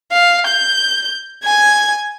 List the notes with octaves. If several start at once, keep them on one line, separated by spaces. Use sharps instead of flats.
F5
G6
G#5 G#6